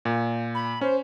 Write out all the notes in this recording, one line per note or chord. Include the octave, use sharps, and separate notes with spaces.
A#2
B5
C#4 C5